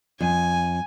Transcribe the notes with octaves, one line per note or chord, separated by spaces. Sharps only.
F2 G#5